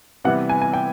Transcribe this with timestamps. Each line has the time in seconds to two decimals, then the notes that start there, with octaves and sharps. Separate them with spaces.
0.24 C3 E3 G3 B3 E4 F#5
0.49 G#5
0.62 G#5
0.73 G5